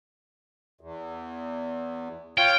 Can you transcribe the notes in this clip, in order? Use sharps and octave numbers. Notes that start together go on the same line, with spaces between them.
E2
F4 C#5 F5 G5